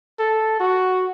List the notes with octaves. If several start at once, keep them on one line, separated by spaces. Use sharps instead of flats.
A4
F#4